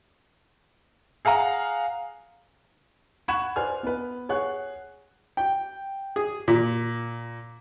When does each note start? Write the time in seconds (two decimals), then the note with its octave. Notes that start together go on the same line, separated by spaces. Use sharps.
1.25 G#4 F5 F#5 A#5
3.28 F#5 B5 C#6 F#6 G#6 E7
3.56 B4 C5 D5 G#5 F6
3.83 B3 B4
4.29 G#4 C#5 F#5 F#6
5.37 G5
6.16 G#4
6.48 A#2